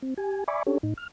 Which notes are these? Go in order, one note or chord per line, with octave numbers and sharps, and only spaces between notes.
C4
G4 G#5
D5 E5 G#5 B5 C#6 D6
C#4 D4 G4 A4 C#5
A2 D#4
F6